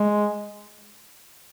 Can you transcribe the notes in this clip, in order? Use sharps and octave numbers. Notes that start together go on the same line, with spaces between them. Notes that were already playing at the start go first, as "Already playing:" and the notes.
Already playing: G#3